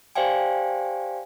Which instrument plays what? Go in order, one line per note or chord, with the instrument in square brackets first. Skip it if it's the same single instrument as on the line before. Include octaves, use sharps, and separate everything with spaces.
[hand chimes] G4 C5 D5 F5 G5 G#5